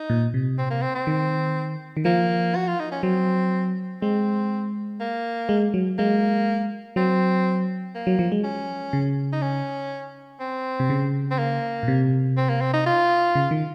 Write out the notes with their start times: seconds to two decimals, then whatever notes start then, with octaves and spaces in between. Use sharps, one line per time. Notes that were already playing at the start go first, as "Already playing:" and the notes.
Already playing: D#4
0.10 A#2
0.34 C3
0.58 C4
0.70 A#3
0.82 C4
0.95 C4
1.07 D#3
1.97 D#3
2.05 F3 A#3
2.56 F#4
2.68 F4
2.80 D#4
2.91 C#4
3.03 F#3 C4
4.02 G#3 C4
5.00 A#3
5.49 G#3
5.74 F#3
5.98 G#3 A#3
6.96 F#3 C4
7.95 A#3
8.07 F#3
8.19 F3
8.32 G#3
8.44 C#4
8.93 C#3
9.33 D#4
9.42 C#4
10.40 C4
10.80 C3
10.90 C#3
11.31 C4
11.39 A#3
11.83 A#2
11.88 C3
12.37 C4
12.49 A#3
12.61 C4
12.73 D#4
12.86 F4
13.35 C#3
13.51 D#3